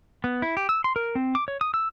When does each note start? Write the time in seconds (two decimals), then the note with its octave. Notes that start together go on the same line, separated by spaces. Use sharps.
0.24 B3
0.42 E4
0.57 G4
0.69 E6
0.84 C6
0.96 A#4
1.15 C4
1.35 D6
1.48 C#5
1.61 D#6
1.74 E6